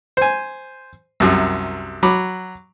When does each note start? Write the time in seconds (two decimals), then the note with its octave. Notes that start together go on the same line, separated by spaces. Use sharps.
0.17 C5 G#5
1.20 C2 F#2 C3
2.03 F#3 B5 D6